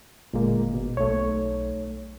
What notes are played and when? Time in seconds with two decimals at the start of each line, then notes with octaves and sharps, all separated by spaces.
0.33 G1 A#2 G#3 A#3
0.74 B2
0.97 B1 A3 C#5